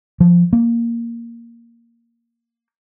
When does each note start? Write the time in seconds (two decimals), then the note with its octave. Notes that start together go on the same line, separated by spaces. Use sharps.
0.20 F3
0.53 A#3